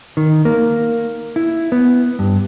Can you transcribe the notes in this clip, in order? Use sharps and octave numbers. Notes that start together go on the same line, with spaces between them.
D#3
A#3
E4
B3
G2